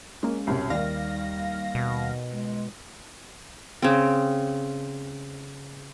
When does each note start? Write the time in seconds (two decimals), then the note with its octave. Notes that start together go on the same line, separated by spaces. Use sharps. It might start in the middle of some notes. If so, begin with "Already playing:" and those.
0.23 G#3 A#3 C#4
0.47 C2 F#2 B2 C#5
0.70 D#2 D#3 G3 D5 F5 A#6
1.75 B2
2.31 G#3
3.82 C#3 C4